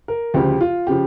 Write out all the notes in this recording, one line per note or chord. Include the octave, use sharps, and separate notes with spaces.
A#4
D2 C#3 F3 G4
F4
C#3 F3 G4